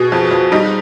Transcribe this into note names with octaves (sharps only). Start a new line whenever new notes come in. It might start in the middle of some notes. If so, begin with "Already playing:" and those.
Already playing: B2 G#4
F2
F2
G3 D#4